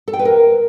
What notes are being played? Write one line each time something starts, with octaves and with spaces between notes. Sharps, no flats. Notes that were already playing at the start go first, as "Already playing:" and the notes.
A4
G5
B4
A#4